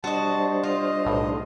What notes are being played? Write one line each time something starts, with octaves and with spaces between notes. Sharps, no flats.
G3 D4 F#4 C5 D#5 A5
F4 D#5
B1 A2